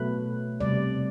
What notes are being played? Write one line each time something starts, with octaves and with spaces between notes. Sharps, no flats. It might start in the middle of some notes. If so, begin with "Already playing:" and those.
Already playing: B2 F#3 A3 B4
C3 G3 D5